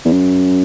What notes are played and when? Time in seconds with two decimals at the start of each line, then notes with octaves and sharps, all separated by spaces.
0.05 E2
0.12 F#2